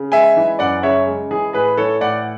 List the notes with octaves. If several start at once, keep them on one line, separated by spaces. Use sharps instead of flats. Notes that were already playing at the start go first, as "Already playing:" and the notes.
Already playing: C#3
G#3 E5 G#5
E3
F#2 D5 F#5
C#3 C#5 E5
G#3
E3 G#4
A2 G#4 B4
E3 A4 C#5
A2 D5 F#5